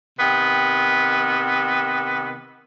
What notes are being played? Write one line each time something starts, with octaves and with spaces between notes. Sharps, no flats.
C3 D#3 B3